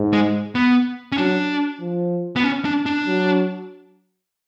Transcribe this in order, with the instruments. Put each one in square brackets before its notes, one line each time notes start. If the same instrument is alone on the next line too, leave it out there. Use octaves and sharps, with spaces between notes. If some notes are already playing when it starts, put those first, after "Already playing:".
Already playing: [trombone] G#2
[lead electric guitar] G#3
B3
C#4
[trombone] F#3 [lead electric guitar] D4
[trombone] F3
[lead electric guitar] B3
C#4
D4
D4
[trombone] F#3